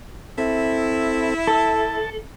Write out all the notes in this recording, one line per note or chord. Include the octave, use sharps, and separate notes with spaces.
C4 E4 A4
A4 A5